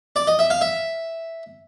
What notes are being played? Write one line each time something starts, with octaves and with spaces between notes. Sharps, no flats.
D5
D#5
E5
F5
E5